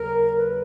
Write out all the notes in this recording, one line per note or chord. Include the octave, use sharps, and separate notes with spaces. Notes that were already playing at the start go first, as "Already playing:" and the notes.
Already playing: D#2 C#3 F#3 A#4
B4